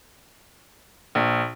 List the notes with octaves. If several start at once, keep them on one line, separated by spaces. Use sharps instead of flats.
A#1